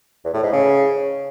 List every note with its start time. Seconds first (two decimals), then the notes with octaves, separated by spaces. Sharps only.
0.25 E2
0.34 A2
0.43 G#2
0.53 C#3